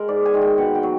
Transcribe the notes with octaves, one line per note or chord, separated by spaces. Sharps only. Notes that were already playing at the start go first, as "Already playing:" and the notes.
Already playing: G#3 A#4
G#2 D5
G#5
D#3 G#3
G5
B2 F#5
G5
F#3